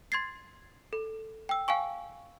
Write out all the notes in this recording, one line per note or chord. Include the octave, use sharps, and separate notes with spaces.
C6 G#6 A6 C7
A4
G5 E6
F5 G5 G#5 C#6